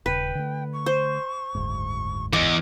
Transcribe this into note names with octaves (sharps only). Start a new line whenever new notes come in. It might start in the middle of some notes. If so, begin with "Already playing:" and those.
D#1 C#3 B4 G5
D3 A3
C#6
C5
F#1 D2 G#2
E2 D#5 D6